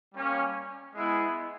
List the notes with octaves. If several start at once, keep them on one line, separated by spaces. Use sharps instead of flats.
G3 A#3 C#4
G#3 B3 E4